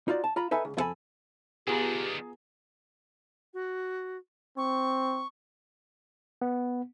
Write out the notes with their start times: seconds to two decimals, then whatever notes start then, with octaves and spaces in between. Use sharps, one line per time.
0.08 D#4 F4 F#4 D5
0.24 A5
0.36 F4 A#5 B5
0.51 D#4 A4 B4 E5 G#5
0.65 C#2
0.77 F2 F4 A4 A#4 G#5 B5
1.67 D#3 B3 D4 F4 G4 G#4 A#5
3.54 F#4
4.57 C4 C#6
6.42 B3